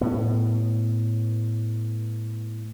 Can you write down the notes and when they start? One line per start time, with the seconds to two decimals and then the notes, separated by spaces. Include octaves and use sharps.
0.01 A2 B3